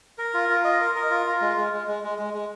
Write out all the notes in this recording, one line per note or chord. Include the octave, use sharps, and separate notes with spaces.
A#4
F4
F4
D#5
A#4
A#4
F4
F4
G#3
G#3
G#3
G#3
G#3
G#3
G#3